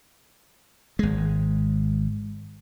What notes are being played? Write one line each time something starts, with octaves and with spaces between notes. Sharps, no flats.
G#1 G#3